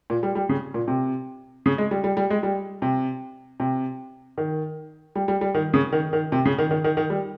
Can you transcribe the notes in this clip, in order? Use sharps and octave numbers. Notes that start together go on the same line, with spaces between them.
A#2
G3
G3
C#3
A#2
C3
C#3
G#3
G3
G3
G3
G#3
G3
C3
C3
D#3
G3
G3
G3
D#3
C#3
D#3
D#3
C3
C#3
D#3
D#3
D#3
D#3
G3